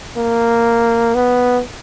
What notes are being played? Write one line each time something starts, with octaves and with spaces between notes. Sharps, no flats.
A#3
B3